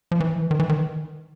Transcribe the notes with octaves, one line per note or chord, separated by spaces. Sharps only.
F3
E3
D#3
E3
D#3